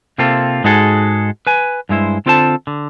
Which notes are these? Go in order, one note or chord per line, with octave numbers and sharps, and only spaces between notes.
C3 A#3 C4 F4 A4
G#2 G#3 D#4 F#4 G#4 A4
B4 G#5
G2 G#3 E4 C5
D3 C4 F4 A4 C5 A5
D3